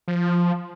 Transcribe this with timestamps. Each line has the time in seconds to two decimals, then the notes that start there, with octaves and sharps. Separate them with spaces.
0.08 F3